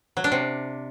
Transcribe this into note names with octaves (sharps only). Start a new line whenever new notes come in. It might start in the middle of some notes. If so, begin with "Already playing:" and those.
F#3
D4
C3